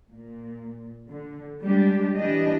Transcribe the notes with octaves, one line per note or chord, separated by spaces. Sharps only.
A#2
D3
G3 G#3 D4 G4
E3 D4 G4 D#5